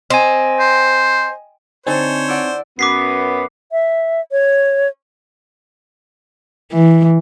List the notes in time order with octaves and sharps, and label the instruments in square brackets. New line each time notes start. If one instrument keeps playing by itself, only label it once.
[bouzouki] C4 [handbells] D#5 G#5
[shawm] C5
[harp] D3 A4 [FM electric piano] C4 D#4 G#5 [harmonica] C5 C#5
[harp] E4 D5 F#5
[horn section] F#2 B3 [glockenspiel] D6 B6 C7
[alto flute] E5
C#5
[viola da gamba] E3